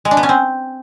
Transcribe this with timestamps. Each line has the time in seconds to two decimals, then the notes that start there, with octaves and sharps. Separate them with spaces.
0.05 G#3
0.11 D4
0.17 B3
0.23 C#4
0.29 C4